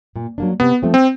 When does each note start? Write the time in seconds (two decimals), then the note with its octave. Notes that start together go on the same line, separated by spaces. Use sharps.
0.16 A#2
0.38 F#3 A#3 D4
0.60 C3 B3
0.83 F3 A3 C4
0.94 C4